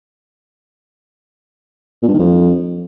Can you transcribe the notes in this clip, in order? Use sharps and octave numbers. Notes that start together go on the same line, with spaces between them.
A#2
G2
D#3
F2